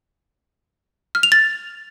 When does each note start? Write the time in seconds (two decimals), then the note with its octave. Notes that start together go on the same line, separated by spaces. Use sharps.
1.15 F6
1.23 F7
1.32 A6